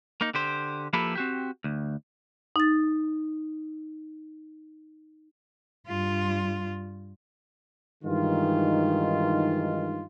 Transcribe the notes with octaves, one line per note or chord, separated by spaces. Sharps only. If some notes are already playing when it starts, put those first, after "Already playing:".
A#3 D#4
D3 G4 C5
F3 A#3 E4 G4 A4 B4
C4 F#4 G4
D2
D#4 A6
G2 F4
G2 D#3 E3 G#3 D#4 F4